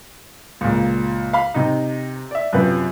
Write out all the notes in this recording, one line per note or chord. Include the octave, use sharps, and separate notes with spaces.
C#2 A#2
F5 B5
C3 D#4
D5 E5
F#2 C3 F3 B4